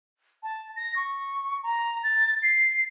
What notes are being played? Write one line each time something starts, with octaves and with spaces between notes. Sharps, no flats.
A5
A#6
C#6
A#5
A6
C7